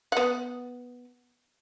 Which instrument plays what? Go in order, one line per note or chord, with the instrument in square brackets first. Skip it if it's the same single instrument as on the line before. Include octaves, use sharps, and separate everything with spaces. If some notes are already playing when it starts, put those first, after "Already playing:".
[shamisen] B3 F#5